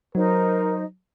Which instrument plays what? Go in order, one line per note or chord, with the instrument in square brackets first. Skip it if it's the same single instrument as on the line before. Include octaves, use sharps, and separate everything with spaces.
[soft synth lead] F#3 [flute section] D#4 C5 D#5 [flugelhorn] A#4